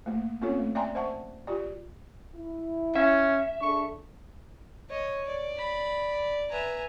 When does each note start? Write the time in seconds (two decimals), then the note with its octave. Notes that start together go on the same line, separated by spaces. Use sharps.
0.06 A3 A#3
0.41 A#3 C4 C#4 F4 A4 C#5
0.59 A3
0.75 D5 E5 G5 G#5 A#5 C6
0.95 C5 E5 F#5 A5 C#6
1.47 F4 G4 D5
2.35 E4
2.95 C#4 E5
3.61 D4 G#4 A4 C#6
4.90 C#5 D#5
5.26 D5
5.57 B5
6.51 B4 E5 G#5 A#5